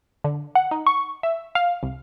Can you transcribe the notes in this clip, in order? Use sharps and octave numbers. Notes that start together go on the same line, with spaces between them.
D3
F#5
D#4
C#6
E5
F5
C2